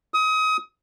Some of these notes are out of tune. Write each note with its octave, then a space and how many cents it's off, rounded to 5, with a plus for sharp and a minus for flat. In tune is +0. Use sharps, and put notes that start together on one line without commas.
D#6 +30